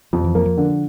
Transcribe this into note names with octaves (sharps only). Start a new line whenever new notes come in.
F2 F3
E3
F3 A#3
F3
D3